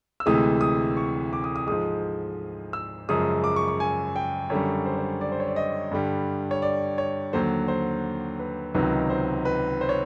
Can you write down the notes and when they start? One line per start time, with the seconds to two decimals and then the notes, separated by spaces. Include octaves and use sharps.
0.20 E6
0.26 D2 C3 E3 G#3 D#6
0.61 D#6
0.97 C#6
1.33 D6
1.44 D#6
1.56 D#6
1.67 G#2 F3 G#3 D#6
2.73 E6
3.09 F#2 C#3 F3 G#3 D#6
3.44 D6
3.56 C#6
3.68 C#6
3.80 G#5
4.16 G5
4.50 F#2 D3 G3 C#5
4.86 C5
4.98 C5
5.21 D5
5.32 C5
5.40 C#5
5.48 D5
5.56 D#5
5.91 G2 D3 G3
6.51 C#5
6.62 D5
6.98 C#5
7.33 D#2 D3 F#3 C5
7.68 C5
8.40 B4
8.75 C#2 C3 D#3 F#3 B4
9.10 C5
9.45 B4
9.81 C5
9.89 C#5